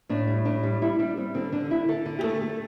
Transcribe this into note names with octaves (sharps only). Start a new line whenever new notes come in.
A2 D4
G3
A2 D4
G3
G3 E4
G3 D4
G3 C4
D3 C4
D3 D4
D3 E4
D3 A4
D3
G4
A3 A4
A3